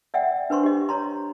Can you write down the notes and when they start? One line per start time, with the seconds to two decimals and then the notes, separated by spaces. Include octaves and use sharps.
0.14 D5 E5 F#5 G5
0.50 D4 B4 C5 C6 C#6
0.64 G4 D#5
0.89 C#5 A#5 C6